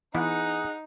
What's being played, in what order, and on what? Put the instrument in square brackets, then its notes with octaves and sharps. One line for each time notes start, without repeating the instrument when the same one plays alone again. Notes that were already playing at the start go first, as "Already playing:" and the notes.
[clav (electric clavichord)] E3 B3 E4 [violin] D#4 [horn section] G#4 D#5 F#5